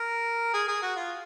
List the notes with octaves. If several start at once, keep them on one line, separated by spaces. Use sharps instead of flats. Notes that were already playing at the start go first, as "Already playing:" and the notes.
Already playing: A#4
G#4
G#4
F#4
F4